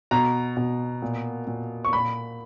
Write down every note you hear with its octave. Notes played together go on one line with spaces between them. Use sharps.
B2 A#5
B2
A#2
A#2
C#6
A#2 B5